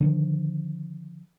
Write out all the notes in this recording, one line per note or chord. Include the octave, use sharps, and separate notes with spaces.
D3 D#3 F3